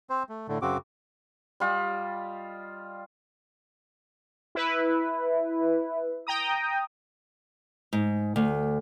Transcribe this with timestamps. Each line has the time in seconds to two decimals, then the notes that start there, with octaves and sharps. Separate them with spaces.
0.10 C4 C5
0.29 A3
0.48 A2 D3 A3
0.62 F#2 C#3 C4 F#4 D6
1.60 G3 F4 D5 D#5
4.55 E4 B4
6.27 G5 A#5 D#6
7.93 G#2
8.36 D2